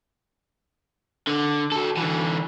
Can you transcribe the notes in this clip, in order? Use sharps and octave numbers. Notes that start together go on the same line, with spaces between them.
D3
F#4 A4
D3 E3